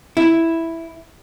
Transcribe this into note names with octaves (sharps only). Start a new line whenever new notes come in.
E4